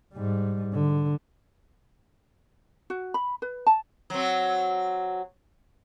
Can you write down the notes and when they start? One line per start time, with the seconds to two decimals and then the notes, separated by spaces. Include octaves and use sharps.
0.14 G#2 G3
0.74 D3
2.90 F#4
3.14 B5
3.42 B4
3.67 A5
4.10 F#3 C4